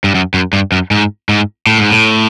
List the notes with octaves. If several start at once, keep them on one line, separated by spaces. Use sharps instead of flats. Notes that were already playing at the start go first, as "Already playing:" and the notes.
G2
F#2
F#2
G2
F#2
G#2
G#2
A2
G#2
A2